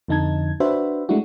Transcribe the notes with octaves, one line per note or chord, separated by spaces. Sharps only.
F2 D3 D#4 A5 G#6
D4 F#4 B4 C5 E5
G#3 A3 D4 E4 F#4